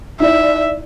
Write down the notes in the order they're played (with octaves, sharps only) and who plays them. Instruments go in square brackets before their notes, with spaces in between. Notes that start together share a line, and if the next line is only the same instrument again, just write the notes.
[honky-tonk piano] D#4 E4 D5 [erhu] E5